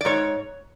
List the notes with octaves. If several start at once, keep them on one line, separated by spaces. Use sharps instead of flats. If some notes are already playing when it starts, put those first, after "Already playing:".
D5
G#2 C#5